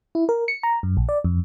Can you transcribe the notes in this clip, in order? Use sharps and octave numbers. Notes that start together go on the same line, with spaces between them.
E4
A#4
C#7
A#5
F#2
A#1
D5
F2